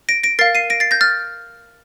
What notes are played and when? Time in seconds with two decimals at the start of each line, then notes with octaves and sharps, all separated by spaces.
0.09 A#6 D7
0.24 A#6 D7
0.39 A#4 F5 A6 C7
0.55 C7 D#7
0.70 A#6 D7
0.80 A6 C7
0.91 G6 A#6
1.01 F6 A6